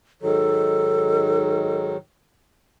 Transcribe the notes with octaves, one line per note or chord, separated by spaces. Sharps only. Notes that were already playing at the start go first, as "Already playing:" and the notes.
G#2 D#3 F#3 A4